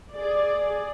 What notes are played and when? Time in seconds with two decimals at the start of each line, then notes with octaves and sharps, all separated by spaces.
0.13 G#4 D5